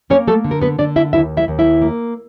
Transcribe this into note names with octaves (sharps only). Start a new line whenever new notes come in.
A#3 C#4 C#5
A3 A4
D3
A#4
B3 B4
D3 D4 D5
E4 E5
D#2 E4 E5
E4 E5
D#2
E4 E5
A#3